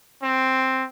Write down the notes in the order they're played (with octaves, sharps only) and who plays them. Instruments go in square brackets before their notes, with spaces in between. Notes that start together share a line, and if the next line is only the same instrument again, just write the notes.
[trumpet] C4